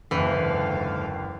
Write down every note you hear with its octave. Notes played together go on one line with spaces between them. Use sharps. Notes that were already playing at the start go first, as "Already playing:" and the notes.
F#1 D#2 G#2 D3 E3 F5